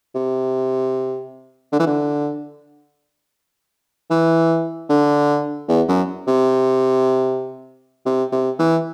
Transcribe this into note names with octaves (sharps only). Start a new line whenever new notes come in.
C3
D3
E3
D3
E3
D3
E2
F#2
C3
C3
C3
E3